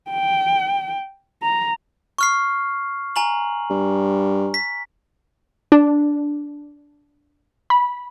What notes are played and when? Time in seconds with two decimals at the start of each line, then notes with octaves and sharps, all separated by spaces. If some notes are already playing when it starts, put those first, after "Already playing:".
0.11 G5
1.42 A#5
2.18 C#6 F6 C7
3.16 G#5 A#5 F#7
3.70 G2
4.54 B6
5.72 D4
7.70 B5